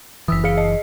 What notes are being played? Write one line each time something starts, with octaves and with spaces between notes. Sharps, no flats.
F#1 E3 D#6 E6 B6
G#4 F5 C#7
D#5